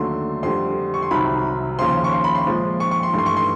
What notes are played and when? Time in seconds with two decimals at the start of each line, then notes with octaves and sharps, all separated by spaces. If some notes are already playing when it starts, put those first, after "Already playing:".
Already playing: D#2 D3 F#3 A3 C6
0.43 F2 D3 G3 C6
0.94 C#6
1.02 C6
1.11 C2 C3 D#3 F#3 B5
1.79 D#2 C#3 F3 C6
2.04 C#6
2.12 C6
2.24 B5
2.35 C6
2.46 A#2 F3 G#3
2.80 C#6
2.91 C#6
3.03 C6
3.14 G2 E3 A3 C6
3.26 C#6
3.37 C6